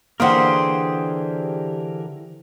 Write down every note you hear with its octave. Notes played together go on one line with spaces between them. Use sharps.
D3 E3 A#3 G4 G#4 A#4 C5 F#5